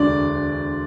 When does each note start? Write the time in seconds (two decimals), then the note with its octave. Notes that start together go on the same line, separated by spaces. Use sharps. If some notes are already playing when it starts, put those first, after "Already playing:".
Already playing: E1 D2 D3 D5